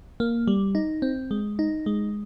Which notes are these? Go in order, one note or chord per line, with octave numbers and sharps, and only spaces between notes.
A#3
G3
D#4
C4
G#3
D#4
G#3